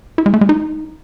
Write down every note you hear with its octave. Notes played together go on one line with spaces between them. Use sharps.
E4
G#3
A3
G#3
D#4